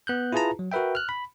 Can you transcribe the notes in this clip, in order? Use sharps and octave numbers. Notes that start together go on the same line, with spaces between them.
B3 F#6 G6
E4 F4 G#4 B4 A5 A#5
F#3
F#4 A#4 B4 E5 G5
F6 F#6
B5